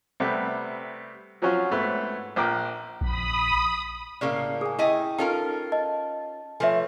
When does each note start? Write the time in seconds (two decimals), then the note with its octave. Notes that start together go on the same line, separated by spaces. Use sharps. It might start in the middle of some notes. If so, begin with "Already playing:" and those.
0.20 C3 G3 A3 B3
1.42 F3 F#3 C4 C#4 F4 F#4
1.71 G#2 A3 B3 C4
2.36 A#1 F3 A#4 G5 D6
3.01 A#1 B5 D#6
4.21 A2 C#3 A#3 D5 C#6
4.61 G#4 G#5 D#6
4.79 A3 E4 D#5 G5 G#5
5.18 C#4 D#4 F4 A4 A#4 G5 A5
5.72 D#5 A5
6.60 F3 A3 A4 B4 C#5 E5 G#5